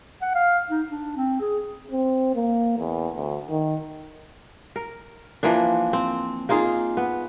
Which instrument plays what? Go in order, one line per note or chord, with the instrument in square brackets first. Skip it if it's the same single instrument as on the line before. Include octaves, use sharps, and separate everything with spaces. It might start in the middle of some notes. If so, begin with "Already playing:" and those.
[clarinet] F#5
F5
D#4
D4
C4
G#4
[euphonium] C4
A#3
E2
D2
D#3
[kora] A#4
E3 F3 A#3 D4
C4
A#3 D#4 F4 G#4
B3